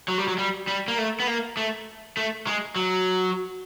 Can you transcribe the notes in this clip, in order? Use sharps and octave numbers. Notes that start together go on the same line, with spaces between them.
F#3
G3
F#3
G3
G3
A#3
A3
B3
A#3
A3
A3
G#3
F#3